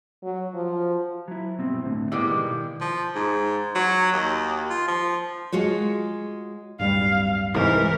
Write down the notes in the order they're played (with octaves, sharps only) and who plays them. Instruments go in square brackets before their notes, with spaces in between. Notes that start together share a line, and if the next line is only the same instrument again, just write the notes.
[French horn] F#3
F3
[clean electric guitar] F#3 E4
G2 B2 C4
D2 A2 D3
[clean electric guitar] G#2 B3 [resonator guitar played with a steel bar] G3 G#3 A#3 [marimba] E4 D5
[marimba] B2 [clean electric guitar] D#3
[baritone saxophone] F3
G#2
F#3
D#2
F4
F3
[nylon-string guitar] G#3 F4 F#4 C#5
[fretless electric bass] D1 G2 G3 [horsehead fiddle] F5
[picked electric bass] C2 G#2 [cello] E3 [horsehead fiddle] A#4